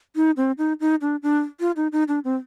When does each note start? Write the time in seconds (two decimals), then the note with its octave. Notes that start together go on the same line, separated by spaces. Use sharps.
0.16 D#4
0.37 C4
0.58 D#4
0.80 D#4
1.01 D4
1.23 D4
1.60 F4
1.76 D#4
1.92 D#4
2.08 D4
2.24 C4